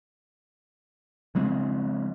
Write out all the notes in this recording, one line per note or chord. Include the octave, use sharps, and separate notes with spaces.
C#3 F3 G#3 C4